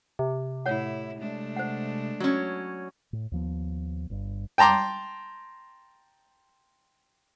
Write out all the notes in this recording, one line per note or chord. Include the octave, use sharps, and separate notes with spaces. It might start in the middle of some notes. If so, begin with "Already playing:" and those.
C3
A2 E4 C#5 F#5
G#3 A3 D4
C5 F#5
F#3 C#4
A2
D#2 F3 B3
G1 G2
G5 A5 A#5 C6 D6